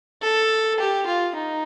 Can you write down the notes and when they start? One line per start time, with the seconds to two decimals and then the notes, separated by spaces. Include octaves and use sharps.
0.22 A4
0.79 G4
1.06 F4
1.35 D#4